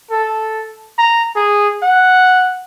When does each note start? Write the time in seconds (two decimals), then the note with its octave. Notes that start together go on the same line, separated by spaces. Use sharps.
0.10 A4
0.98 A#5
1.35 G#4
1.83 F#5